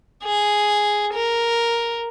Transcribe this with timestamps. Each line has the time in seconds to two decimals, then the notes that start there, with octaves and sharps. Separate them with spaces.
0.23 G#4
1.14 A#4